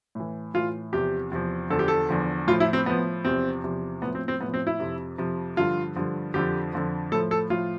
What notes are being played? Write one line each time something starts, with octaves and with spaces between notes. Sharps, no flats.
A2 E3
A2 E3 F4
E2 C3 F3 G4
E2 C3 F3
E2 D3 F3 A4
G4
A4
E2 D3 F3
A2 F3 F4
E4
C4
A2 F3 B3
E2 C3 F3 C4
E2 C3 F3
A2 F3 B3
C4
C4
A2 F3 B3
C4
E4
F2 C3 F3
F2 C3 F3
G2 D3 F3 F4
G2 D3 F3
F2 D3 F3 G4
F2 D3 F3
A2 F3 A4
A4
A2 F3 F4